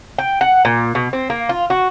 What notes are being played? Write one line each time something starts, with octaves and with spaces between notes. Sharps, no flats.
G5
F#5
A#2
B2
C4
A#3
F4
F#4